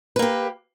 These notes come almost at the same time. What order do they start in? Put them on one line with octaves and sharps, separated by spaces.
B4 A#3 G4